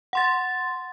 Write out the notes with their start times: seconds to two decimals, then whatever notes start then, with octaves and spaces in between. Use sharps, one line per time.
0.13 F#5 C6 A6